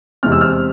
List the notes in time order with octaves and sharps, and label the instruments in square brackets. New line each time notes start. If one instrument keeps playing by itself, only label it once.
[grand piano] E2 C3 E3 G#3 C4 F6
E6
F6